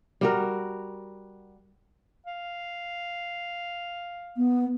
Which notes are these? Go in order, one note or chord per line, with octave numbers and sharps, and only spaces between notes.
G3 F#4 A#4
F5
B3